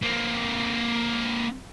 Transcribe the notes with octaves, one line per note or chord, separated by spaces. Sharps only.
A#3 C4